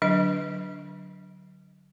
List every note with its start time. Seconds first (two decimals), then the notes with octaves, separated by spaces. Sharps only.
0.02 D3 F#3 D4 D#5